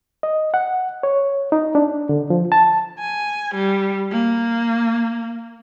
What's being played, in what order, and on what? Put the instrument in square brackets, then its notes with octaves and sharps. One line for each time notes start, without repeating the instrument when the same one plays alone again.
[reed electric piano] D#5
F#5
C#5
D#4
D4
D3
F3
A5
[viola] G#5
G3
A#3